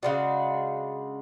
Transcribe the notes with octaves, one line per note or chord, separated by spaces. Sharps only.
C#3 G#3 D4 F#4